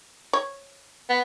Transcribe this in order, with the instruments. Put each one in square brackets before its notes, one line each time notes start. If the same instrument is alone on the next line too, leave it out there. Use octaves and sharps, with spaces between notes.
[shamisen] C#5
[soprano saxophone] B3